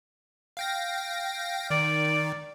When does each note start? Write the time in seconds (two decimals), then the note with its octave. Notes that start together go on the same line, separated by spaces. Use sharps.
0.57 F5 G5 A#6
1.70 D#3 D5